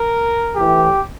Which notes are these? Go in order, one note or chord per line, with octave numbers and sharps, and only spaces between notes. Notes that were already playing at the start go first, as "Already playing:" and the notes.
Already playing: A#4
A2 E3 G4